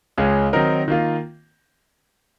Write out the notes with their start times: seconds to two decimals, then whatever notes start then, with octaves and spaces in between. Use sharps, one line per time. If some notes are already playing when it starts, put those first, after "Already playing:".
0.18 C#2 C#3 G#3 C#4 G#4
0.53 D#3 F#3 C4 D#4 A#4
0.88 D#3 A#3 F4